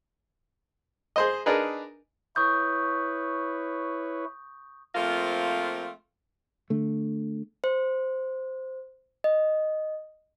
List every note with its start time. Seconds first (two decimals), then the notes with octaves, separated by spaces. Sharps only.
1.16 G#4 C5 D#5
1.46 D4 D#4 G#4 A#4 B4
2.36 E4 B4 C#5 C#6 D#6 G6
4.95 F3 A3 A#3 C4 F4
6.70 D3 A3
7.64 C5
9.24 D#5